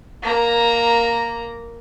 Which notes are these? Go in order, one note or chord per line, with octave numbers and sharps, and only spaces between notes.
A#3 A#5